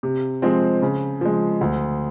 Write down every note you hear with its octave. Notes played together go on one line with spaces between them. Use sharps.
C3
F3 G#3 C4
C#3
F3 G#3
D2